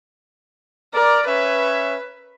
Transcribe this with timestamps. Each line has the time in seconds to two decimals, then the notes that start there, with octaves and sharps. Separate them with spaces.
0.94 A#4 D5
1.27 C#4 B4 C#5 E5